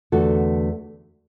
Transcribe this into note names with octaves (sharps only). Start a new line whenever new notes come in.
E2 D3 A3 F#4 A4